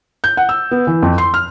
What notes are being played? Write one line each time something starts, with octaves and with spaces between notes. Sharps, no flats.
G6
F#5
E6
B3
E3
F2
C6
F6